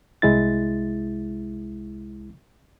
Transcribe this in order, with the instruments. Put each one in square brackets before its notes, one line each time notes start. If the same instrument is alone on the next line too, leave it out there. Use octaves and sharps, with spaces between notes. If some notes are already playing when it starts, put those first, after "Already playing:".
[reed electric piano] C2 G#3 E4 A6